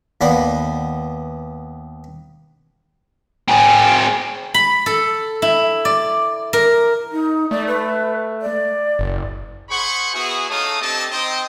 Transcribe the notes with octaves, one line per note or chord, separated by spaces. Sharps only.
D#2 B3 D5 F#5
C4 G#4
B5
A4
E4
D5
A#4
D#4
A3 D5
B4
D5
F#1
G#4 C5 F#5 B5 C#6
B3 E4 F#4 G#4
A3 D#4 C#5 F5 A5 D#6
C4 D4 G4 A4 D#5 A5
C4 D#4 C5 D#5 G5